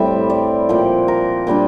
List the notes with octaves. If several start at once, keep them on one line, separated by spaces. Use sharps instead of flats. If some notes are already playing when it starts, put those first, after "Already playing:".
Already playing: A2 G3 C4 E5
D5
A#2 F3 C4
A#4
A#2 G3 A#3 D4